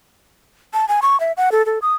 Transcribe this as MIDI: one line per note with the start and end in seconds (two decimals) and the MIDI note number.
0.73 0.88 81
0.88 1.00 80
1.02 1.19 85
1.20 1.32 76
1.37 1.52 78
1.52 1.65 69
1.66 1.79 69
1.82 1.93 87